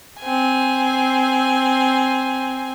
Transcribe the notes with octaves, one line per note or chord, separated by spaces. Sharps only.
C4 G#5